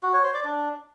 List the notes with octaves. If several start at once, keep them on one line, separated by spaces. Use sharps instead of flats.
F#4
C#5
C5
D5
D4